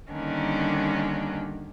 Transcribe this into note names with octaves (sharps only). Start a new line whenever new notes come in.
D3 D#3 G3 A#3 C#4 D4